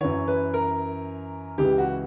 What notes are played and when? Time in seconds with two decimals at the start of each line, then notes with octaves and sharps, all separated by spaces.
0.01 F#2 E3 C#5
0.28 B4
0.54 A#4
1.58 C#2 C#3 E3 G4
1.78 F#4